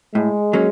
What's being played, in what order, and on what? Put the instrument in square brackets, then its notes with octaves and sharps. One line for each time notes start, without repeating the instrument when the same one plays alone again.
[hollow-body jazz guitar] A2 [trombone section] G#3
[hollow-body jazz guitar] F#3 A#3 C#4